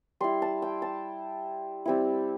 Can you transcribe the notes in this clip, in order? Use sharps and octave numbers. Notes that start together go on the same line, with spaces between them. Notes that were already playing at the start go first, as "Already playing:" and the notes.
G3 E4 C6
A5
G5
A5
G3 C4 E4